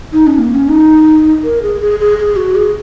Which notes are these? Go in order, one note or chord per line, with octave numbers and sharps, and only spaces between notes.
D#4
C#4
A#3
C#4
D#4
A#4
G#4
G#4
G#4
G#4
F#4
G#4